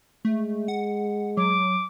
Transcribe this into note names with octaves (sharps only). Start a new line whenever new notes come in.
G#3 A3
F#5
F#3 D6